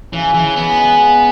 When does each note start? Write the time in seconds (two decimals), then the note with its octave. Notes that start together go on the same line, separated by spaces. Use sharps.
0.12 C#3 E3
0.34 C#3 E3
0.56 G#3 B3
0.79 G#3
1.00 C#3